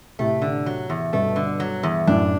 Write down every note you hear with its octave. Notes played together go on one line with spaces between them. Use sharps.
A2 C3 A3
D3
F#3
E2
G2 B2 A3
D3
F#3
E2
F#2 A2 D4